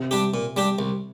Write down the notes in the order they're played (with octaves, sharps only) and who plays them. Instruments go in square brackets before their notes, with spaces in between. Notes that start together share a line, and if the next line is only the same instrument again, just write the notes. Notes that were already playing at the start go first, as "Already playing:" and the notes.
Already playing: [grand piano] C3
[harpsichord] G3 D4 G4
A#2
G3 D4 G4
C2